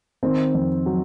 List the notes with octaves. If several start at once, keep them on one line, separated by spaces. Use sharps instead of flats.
D#3 C4
F2
F#3